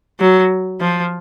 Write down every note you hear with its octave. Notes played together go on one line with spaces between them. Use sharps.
F#3
F3